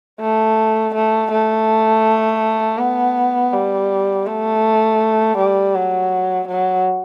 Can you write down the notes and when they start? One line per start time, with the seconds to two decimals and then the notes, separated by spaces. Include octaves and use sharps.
0.20 A3
0.94 A3
1.31 A3
2.79 B3
3.53 G3
4.26 A3
5.37 G3
5.75 F#3
6.48 F#3